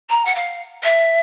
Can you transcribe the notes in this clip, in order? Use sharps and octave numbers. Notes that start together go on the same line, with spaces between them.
A#5
F#5
F5
E5